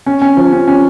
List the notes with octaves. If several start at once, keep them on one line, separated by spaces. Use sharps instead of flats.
C#4
C#4
F3
C#4
C#4